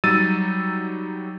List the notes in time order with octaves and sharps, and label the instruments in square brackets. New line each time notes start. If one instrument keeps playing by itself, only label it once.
[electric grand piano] F#3 G3 D#4 E6 A6 D#7